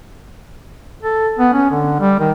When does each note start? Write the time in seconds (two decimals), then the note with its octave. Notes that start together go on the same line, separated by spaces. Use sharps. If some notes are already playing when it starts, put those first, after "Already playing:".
1.02 A4
1.39 B3
1.53 C#4
1.70 D3
2.00 G3
2.20 D#3